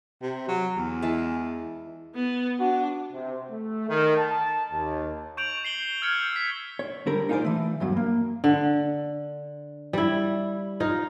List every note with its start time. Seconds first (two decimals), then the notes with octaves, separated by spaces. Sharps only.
0.22 C3
0.48 F#3
0.77 E2
1.02 E3 G#3 A5
2.15 B3
2.60 D4 F#4
3.12 C3
3.50 A3
3.88 D#3
4.18 A5
4.72 D#2
5.37 C#6 G6 D7 F7 F#7
5.65 C7 F#7 G7
6.02 E6 F6 G6 G#6 C#7 F7
6.33 E6 B6
6.79 C#5
7.06 D3 G3 A#4
7.29 D#4 F4 G#4 A4 C5 D5
7.44 E3 A3
7.80 E2 G2 F#3
7.97 A#3
8.44 D3
9.93 G3 E4
10.80 D#4 F4